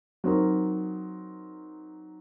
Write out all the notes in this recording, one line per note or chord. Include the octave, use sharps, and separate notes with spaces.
F#3 C4 D#4 A#4